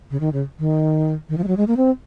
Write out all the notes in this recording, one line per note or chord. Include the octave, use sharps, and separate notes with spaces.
C#3
D#3
C#3
D#3
D#3
F3
G#3
F#3
G#3
A#3
C4